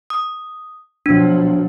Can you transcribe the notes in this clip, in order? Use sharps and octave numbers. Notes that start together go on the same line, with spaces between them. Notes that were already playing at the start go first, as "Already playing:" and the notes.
D#6
B2 F3 F#3 D4